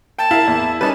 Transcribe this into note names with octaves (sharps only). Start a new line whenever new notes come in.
G5 A5
E4 A#4 F5
E2
G3 C#4 D#4 B4 A5